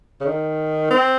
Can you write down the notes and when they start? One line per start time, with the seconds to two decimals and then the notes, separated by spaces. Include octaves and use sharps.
0.21 C#3
0.26 D#3
0.91 C4